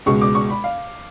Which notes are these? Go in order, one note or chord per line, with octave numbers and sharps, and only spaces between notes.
C#2 B2 G#3 C#6
D6
C#6
B5
F5